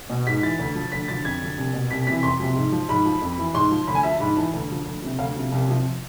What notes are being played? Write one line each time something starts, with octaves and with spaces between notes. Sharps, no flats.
B2
G#2 B6
E3 A6
D2
D3 F3
D2 B6
D3 F3 A6
F2 G#6
D3 F3
C2
B2
C2 B6
C3 E3 B6
F2 C6
C3 F3
G#2
F3
G#2 B5
F3
F2
E3
G#2 C6
F3
D2 B5
G#5
D3 F3 E5
A5
G#2 B5
E3 A5
D2
D3 F3
D2
C3 F3
D2 F5
C3 F3
C2
C3 F3